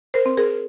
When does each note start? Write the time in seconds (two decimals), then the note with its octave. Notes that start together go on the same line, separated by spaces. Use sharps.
0.14 A#4 C5
0.26 C4
0.37 G#4 A#4